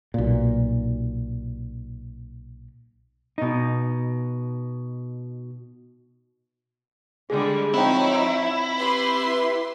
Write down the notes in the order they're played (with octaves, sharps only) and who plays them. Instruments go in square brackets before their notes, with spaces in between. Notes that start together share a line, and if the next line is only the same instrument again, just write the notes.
[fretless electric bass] B1 A#2
[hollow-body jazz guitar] B2 D#4
[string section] D3 G3 G#3 [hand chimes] G#4
[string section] F3 D#4 C#5 [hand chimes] C4 G5 [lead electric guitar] E4
[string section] G4 B4 C6